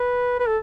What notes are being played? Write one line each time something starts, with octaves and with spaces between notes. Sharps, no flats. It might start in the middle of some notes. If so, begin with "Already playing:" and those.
Already playing: B4
B4
A4